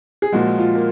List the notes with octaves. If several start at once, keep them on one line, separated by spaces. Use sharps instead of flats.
G#4
A#2 F3 G#3 F#4
F4
A#3